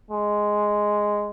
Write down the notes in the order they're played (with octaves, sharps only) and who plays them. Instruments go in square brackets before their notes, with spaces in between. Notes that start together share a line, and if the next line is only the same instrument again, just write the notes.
[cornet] G#3